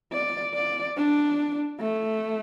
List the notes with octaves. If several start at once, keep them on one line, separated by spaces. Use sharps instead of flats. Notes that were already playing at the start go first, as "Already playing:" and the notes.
D5
D5
D4
A3